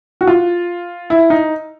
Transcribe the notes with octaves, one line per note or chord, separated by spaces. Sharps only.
F#4
F4
E4
D#4